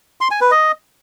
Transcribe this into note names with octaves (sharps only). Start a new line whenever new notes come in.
C6
G#5
B4
D#5